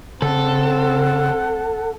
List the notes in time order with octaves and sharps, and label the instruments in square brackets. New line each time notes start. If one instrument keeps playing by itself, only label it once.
[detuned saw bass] C#3 [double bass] C4 [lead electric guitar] A4 [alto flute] F#5